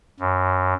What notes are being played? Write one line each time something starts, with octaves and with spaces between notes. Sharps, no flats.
F#2